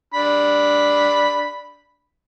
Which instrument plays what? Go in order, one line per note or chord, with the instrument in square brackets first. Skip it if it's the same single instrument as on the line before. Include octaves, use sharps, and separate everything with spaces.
[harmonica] D4 B5